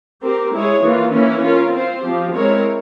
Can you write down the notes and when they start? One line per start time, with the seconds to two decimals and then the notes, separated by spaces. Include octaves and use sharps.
0.22 C4 G4 A#4
0.53 G#3 E4 G#4 C#5
0.83 E3 A#3 F4
1.13 E3 A#3 C#4 E4
1.43 C#4 F4 A#4
1.73 C4 F4 C5
2.03 F3 C4 G4
2.34 G#3 C4 E4 A#4 C#5